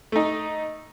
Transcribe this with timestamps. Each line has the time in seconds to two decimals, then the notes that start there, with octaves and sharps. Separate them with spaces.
0.12 A3 D#4